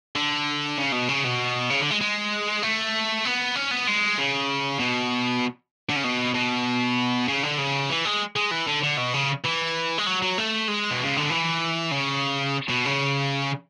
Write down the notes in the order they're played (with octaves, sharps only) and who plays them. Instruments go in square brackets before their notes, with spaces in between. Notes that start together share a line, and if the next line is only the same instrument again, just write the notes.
[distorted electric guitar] D3
C#3
B2
C#3
B2
C#3
D3
G#3
G#3
A3
B3
C#4
B3
G#3
C#3
B2
D3
C#3
B2
B2
C#3
D3
C#3
E3
G#3
G#3
E3
D3
D3
B2
C#3
E3
G#3
F#3
F#3
A3
G#3
B2
C#3
D3
E3
C#3
B2
C#3